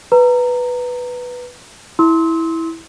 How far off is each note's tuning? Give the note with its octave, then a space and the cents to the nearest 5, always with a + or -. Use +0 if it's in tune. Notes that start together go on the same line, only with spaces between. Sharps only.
B4 +0 A#5 -15
E4 -10 C6 +0 E6 -40